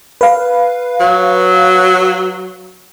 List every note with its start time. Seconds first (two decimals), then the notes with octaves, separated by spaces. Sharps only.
0.21 B4 F5
1.00 F#3